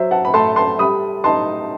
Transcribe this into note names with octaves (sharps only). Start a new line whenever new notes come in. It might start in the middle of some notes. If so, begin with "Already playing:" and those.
Already playing: F#3 C5 E5
F#5 A5
B5
A3 A5 C6
A5 C6
G3 B5 D#6
D#4 A5 C6